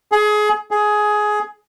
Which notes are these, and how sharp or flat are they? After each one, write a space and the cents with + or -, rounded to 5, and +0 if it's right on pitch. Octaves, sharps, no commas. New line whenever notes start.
G#4 +25
G#4 +15